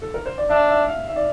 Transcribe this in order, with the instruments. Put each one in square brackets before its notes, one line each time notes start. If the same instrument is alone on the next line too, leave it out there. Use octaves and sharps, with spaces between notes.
[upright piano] A4
A#4
C5
D5
[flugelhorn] D4 [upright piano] E5
[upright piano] E5
F5
E5
D5